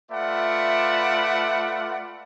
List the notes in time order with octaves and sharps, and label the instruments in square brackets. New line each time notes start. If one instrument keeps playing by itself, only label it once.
[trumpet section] A3 F4 B4 D5 E5 F#5